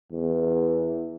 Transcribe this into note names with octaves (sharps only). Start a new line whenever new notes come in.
E2